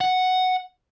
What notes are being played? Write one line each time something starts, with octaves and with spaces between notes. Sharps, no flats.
F#5